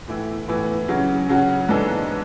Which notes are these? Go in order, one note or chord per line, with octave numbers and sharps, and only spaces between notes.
A2 E3 B3 E4
A2 E3 B3 E4
C#3 F#3 C#4 F#4
C#3 F#3 C#4 F#4
G#2 E3 B3 D4 A4
B3